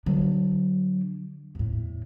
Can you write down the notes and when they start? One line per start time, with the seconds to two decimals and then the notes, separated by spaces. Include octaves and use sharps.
0.06 D3 F#3 D4
1.55 E2 A2